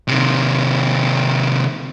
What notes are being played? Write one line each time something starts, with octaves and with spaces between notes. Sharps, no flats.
C3 D#3